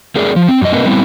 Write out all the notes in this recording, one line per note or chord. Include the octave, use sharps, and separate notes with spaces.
A3 C4 G#4 A#4 D5
F3
C4
F#2 D#5
A#3 C4 A#4 B4 D#5
G3 B3 C4 E4